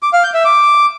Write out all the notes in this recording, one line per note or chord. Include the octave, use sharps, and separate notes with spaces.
D6
F5
G6
E5
D6